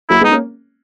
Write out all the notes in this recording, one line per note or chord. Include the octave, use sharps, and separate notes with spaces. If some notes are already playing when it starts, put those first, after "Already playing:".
F#3 A#3 E4
G#3 B3
D#4
A#3 C#4